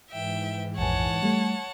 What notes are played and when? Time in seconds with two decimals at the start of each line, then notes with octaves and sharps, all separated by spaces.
0.12 G#2 E3 E5 G5
0.78 A#1 F2 C#5 F#5 G#5 A5
1.23 G3 A3